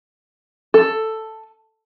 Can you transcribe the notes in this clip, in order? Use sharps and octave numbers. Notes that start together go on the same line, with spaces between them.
A4